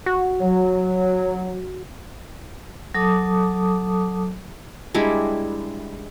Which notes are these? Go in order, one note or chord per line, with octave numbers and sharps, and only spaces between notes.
F#4
F#3
F#3 A4 A5 D6 D#6
G3 G#3 D4 E4